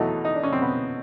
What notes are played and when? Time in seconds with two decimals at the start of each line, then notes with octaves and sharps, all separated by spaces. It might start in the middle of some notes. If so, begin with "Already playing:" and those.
Already playing: E2 B2 F#3 A3 D#4
0.25 D#4
0.35 D4
0.43 C#4
0.52 C4
0.62 B3